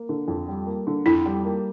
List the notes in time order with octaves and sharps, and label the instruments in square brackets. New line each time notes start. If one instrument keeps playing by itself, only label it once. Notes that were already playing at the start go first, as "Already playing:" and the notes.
Already playing: [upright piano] A#3
D3
F2
G3
A#3
D3
[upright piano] F2 [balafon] E4
[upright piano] G3
A#3